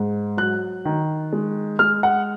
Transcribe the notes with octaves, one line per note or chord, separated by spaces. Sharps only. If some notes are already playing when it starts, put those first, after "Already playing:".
Already playing: G#2
F#3 F#6
D#3
G#3
G#3 F6
F#5